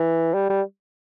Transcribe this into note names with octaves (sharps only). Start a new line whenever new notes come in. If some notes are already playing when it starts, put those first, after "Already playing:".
Already playing: E3
G3
G3